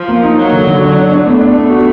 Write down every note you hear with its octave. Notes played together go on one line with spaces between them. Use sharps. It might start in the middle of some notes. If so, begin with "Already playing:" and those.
Already playing: F3
A#3
D#4
F#3 A#3
D3
D3
F#3 D4
D4
D4
A3 B3
D4
B3
F#4